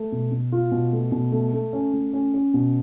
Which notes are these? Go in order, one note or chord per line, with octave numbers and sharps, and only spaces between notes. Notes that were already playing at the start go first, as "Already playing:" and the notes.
Already playing: A3
B2
B2
F4
B2
A3
B2
A3
A3
C#4
A3
C#4
C#4
B2